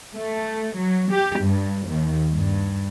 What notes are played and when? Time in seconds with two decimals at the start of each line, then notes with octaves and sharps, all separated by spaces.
0.14 A3
0.77 F#3
1.11 G4
1.40 G2
1.87 D#2
2.33 G2